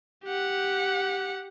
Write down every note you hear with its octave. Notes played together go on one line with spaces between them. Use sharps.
G4 F#5